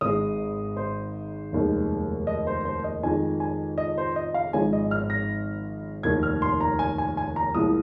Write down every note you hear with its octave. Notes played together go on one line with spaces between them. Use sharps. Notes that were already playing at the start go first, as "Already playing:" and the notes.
G#1 G#2 G#3 D#6
C5
F1 D#2 D#3 G#3
D#5
C5
C5
D#5
F2 D#3 G#3 G#5
G#5
D#5
C5
D#5
F5
G#1 G#2 F3 G#3 G#5
D#5
F6
A#6
F1 D#2 D#3 G#6
F6
C6
A#5
G#5
G#5
G#5
A#5
C2 A#2 F3 G#3 D#6